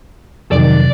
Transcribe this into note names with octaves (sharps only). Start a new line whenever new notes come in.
F2 C3 D#3 F#3 D5